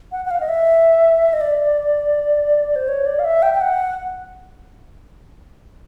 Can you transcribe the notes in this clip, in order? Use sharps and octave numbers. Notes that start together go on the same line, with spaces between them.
F#5
F#5
F5
D#5
E5
D#5
D5
C5
C#5
D5
F5
E5
G5
G5
F#5